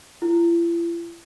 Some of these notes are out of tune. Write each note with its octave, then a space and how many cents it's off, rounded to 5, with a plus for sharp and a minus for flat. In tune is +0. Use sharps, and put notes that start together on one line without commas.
E4 +45